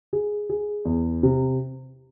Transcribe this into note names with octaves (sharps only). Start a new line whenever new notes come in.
G#4
G#4
E2
C3